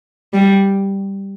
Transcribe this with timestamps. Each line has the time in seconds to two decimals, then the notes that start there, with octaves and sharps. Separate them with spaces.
0.33 G3